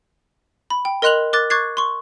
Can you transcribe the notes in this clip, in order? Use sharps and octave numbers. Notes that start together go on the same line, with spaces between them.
B5
G5
A#4 D#5 C6 F#6 F7 F#7
A#4 D6 F#6 A6
C#6 D6 F#6 G#6 A6 C7
C6 C#6